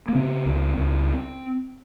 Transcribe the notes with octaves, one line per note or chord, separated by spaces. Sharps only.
A#3
C#3 C4
C#2
C#2